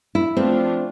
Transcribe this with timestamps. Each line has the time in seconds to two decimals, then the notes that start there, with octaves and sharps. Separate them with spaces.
0.15 E4
0.37 F3 A3 C4 D4 F4